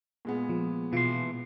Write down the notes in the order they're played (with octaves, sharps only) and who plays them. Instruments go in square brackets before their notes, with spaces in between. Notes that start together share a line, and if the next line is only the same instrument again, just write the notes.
[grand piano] A#2 G#3 B3
[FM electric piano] F3
[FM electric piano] B2 F4 [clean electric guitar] E3 C6